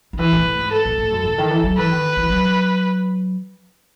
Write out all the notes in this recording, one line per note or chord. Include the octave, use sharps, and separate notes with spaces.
D#3
E3 B4
A2
A2
G#2
A4
A2
A2
F#2
C#3
D#3
E3
F#3
E3 B4
D#3
E3
F#3